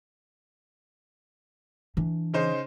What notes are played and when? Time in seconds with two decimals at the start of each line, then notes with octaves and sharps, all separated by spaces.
1.97 E3 D4
2.34 C#3 D#4 C5